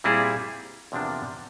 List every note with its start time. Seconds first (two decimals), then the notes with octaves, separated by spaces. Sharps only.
0.04 A#2 G3 C4 E4 G#4
0.92 E2 C3 F3 A#3 D4